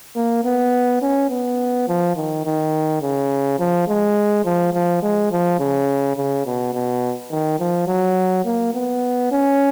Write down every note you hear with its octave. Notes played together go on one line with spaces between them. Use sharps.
A#3
B3
C#4
B3
F3
D#3
D#3
C#3
F3
G#3
F3
F3
G#3
F3
C#3
C#3
B2
B2
D#3
F3
F#3
A#3
B3
C#4